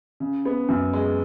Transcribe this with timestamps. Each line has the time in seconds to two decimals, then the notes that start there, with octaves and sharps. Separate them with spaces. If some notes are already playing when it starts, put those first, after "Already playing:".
0.20 C#3
0.45 B3
0.69 F#2
0.93 G#3